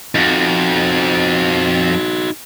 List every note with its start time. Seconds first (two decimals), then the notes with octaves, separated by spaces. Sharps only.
0.15 F2 D#4 F#4